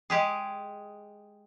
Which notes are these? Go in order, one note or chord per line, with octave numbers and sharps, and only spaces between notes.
G#3 G4 G#4